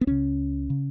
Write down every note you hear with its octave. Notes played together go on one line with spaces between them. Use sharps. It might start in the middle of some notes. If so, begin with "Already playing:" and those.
B3
C#2 C#3 C#4
C#3